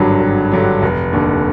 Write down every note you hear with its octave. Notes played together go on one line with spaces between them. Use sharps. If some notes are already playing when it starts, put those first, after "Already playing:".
Already playing: G#1 G2 D3 F#3
G#1
G2 D3 F#3
F1
D#2 D3